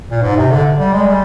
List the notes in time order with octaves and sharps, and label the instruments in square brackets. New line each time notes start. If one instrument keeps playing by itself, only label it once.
[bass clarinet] A#2
G#2
C3
D3
G3
G#3
G3